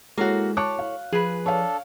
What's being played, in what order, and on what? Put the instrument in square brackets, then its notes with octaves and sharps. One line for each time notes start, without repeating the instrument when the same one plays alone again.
[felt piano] G#3 C#5 [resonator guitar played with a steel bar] A#3 F#4 [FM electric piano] E4 A4
[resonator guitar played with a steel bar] C#5 [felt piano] A5 D6 F#6
[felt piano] F5
[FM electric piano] F3 [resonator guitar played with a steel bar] G#4 B4
[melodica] D4 A4 [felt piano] C#5 F5